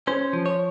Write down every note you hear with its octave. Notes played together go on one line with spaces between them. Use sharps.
C#4 C5
F3
C#5